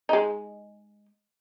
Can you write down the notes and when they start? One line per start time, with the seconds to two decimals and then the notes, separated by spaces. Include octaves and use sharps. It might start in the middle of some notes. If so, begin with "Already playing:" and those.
0.09 G#3 D#4